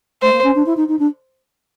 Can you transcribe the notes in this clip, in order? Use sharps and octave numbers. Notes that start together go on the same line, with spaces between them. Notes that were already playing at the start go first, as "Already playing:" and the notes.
A3 C5
A#3
C#4
D4
E4
D#4
D#4
D4